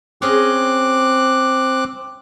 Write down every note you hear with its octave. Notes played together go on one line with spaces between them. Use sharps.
C4 C#4 G#4 D#5 D6 F#6